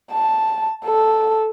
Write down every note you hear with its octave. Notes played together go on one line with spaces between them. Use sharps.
A5
A4